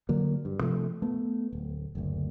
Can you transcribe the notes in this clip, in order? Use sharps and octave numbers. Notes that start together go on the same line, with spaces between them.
D3 F#3 A#3
G2
C3 F3 A3
A3 B3
D1
F#1 D2